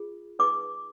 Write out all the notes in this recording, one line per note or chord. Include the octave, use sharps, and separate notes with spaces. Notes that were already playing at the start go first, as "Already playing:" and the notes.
Already playing: F4 G#4
D#4 G#4 B4 D6